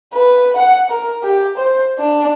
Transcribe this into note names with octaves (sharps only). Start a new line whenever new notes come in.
B4
F#5
A#4
G4
C5
D4